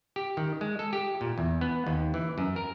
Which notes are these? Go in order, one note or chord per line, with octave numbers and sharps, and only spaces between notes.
G4
D#3
G#3
A4
G4
A#2
E2
B3
D#2
E3
F#2
A#4